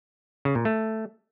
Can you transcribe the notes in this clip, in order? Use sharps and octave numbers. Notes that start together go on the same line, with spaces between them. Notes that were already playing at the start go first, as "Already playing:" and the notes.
C#3
A#2
A3